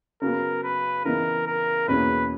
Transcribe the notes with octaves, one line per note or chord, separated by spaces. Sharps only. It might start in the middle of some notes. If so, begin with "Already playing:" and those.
C#3 F#3 B3 A#4
B4
C#3 E3 B3 D#4 A#4
A#4
E2 B2 A#3 C#4 G#4 B4